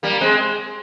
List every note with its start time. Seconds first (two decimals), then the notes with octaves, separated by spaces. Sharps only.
0.03 G3 A#3
0.21 G#3 C4